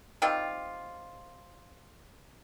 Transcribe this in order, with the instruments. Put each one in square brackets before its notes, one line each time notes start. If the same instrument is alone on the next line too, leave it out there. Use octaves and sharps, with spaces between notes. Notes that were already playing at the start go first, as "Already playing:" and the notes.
[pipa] D#3 G3 C4 F4